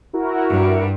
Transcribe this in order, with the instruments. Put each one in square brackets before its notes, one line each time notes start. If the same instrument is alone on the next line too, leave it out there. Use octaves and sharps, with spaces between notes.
[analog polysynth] E4 F#4 A#4
[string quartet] G2